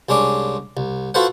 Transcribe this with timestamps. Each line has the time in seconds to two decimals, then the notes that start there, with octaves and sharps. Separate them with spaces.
0.09 C2 G#3 C#4 D4 D6
0.77 C2
1.14 F4 F#4 A4 B4 C5 F#5